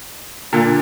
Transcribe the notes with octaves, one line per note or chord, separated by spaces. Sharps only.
A#2 D3